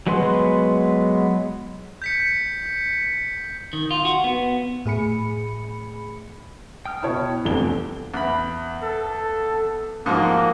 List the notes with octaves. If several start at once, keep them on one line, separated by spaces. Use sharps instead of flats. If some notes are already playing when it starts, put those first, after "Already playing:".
F#3 G#3 B3 B4 C6
G6 B6 C#7
D#3
F4
F#4
B3
A2 G#4 B5 C#7
G5 D#6 F6
B2 E4 C#5 A5
F1 E2 G3 C4 D4 A4 G7
E2 B5
A4
G#2 F3 A#3 F#4